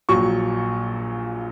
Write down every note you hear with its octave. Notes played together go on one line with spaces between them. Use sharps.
A#1 A#2 F#3 C#6